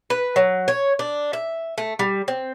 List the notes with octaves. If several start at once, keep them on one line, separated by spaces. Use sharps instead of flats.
B4
F#3
C#5
D4
E5
A3
G3
C4